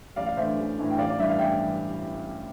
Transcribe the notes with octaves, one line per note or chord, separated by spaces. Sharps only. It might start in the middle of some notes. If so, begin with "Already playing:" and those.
A1 D5 F5
F5
A2 E3 A3 D4 C5 E5
A1
A2 E3 A3 D4
G5
A1 D5 F5
D5
G2 E3 E5
F5
A1 E5 G5
E3